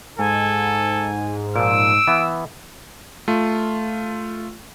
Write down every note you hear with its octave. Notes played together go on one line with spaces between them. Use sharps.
G#2 A4 G#5
A#2 F3 E6 D7
E3 B3
A3 F4